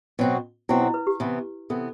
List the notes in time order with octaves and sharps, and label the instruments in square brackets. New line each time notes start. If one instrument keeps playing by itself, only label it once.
[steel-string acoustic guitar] B2 F#3 C4 F#4
[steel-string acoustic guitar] B2 F#3 C4 F#4 [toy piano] E4
[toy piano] E4
B4
G4
[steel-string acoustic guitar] C3 E3 B3
[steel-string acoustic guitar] C3 E3 B3 [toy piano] A4